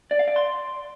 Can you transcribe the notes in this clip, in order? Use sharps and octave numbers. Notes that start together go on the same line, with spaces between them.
D5
F5
D5
C6